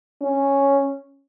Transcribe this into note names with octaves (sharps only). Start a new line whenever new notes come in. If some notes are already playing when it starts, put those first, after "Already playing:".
C#4